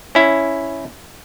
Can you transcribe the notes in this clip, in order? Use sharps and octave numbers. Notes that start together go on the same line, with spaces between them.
C#4 E4